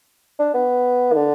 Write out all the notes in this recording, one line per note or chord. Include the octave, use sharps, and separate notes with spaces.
D4
B3
D#3
D3